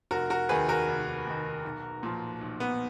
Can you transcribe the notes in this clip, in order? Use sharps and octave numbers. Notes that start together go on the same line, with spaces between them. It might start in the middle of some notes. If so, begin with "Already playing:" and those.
F1 F#4 A#4
F#4 A#4
D#2 D#3 G#4 B4
F#4 A#4
F1
D#2 D#3
B1
A#2 F3
B1
B3